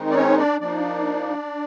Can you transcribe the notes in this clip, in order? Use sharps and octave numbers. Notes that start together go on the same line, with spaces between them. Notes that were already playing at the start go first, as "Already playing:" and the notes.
Already playing: D#3 G#3 C4 D#4
D5
C#4 C#5
D4 D5
F3 A#3 D4 D#4 D5